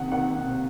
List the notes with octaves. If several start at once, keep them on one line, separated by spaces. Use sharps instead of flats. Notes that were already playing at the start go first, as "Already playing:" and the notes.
Already playing: C3 D#3 F#5
D#3 F#5
C3